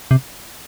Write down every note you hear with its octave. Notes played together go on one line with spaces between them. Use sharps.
C3